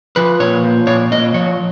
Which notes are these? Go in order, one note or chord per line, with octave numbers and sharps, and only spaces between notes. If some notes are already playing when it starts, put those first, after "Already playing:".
F3 B4
A#2 C#5
F3
A#2 C#5
A#2 D#5
F3 C#5